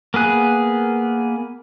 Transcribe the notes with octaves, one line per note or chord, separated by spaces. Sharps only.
A#3 B3 G#4 F#6